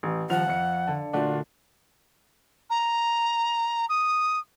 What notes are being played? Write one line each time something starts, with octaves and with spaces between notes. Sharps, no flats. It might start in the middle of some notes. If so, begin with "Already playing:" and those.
A1
D#1 F3 F5 F#5 F7
F2 C#7
D3 A5
A#2 A3 D4 F4 F#4
A#5
D#6